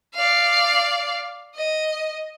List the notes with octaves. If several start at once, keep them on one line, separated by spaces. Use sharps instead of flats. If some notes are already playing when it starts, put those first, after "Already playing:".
D5 F5
D#5